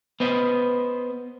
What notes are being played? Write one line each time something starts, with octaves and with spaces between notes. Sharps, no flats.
B3 C5 D#5